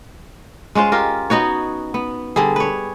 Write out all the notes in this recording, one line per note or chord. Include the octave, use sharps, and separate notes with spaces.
G#3 C#4 F4 C5
F4 G4 A#4
B3 D#4 F#4 C#5
B3
D3 G3 G#4
B4 C#5